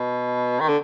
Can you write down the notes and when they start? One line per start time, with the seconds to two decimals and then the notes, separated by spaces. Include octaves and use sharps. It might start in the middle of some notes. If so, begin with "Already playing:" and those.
Already playing: B2
0.60 D#3
0.69 D3